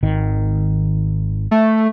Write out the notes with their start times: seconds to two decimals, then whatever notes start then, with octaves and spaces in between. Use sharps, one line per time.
0.03 G#1 D#3
1.51 A3